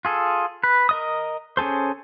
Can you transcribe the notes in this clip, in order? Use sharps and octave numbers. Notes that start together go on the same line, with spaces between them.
F4 G#4 A4
B4
A#4 D#5 D#6
C#4 G#4 A4 C5